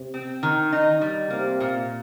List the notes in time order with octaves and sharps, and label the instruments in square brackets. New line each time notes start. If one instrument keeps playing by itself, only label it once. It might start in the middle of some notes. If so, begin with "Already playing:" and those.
Already playing: [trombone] C3
[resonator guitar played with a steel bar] C4
D#3
D#4
G3
[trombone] C3 [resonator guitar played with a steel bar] A#3
[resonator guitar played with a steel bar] A#2